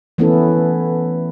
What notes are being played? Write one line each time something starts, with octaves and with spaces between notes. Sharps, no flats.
E3 A3 B3 C#4 E4 A4